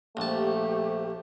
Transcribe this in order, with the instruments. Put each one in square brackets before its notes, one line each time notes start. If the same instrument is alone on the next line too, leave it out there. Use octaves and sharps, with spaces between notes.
[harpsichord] A#1 A5 [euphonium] A3 [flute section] G4 C5